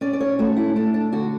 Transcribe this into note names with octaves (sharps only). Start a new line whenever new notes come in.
C#4 D5
D5
C#5
A3 F#4
E4
A3 D4
D4
D3 F#4